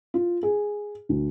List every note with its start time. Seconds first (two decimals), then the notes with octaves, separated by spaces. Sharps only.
0.14 F4
0.43 G#4
1.09 D2